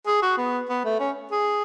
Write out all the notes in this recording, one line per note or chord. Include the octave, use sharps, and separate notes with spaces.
G#4
F#4
B3
B3
A3
C#4
G#4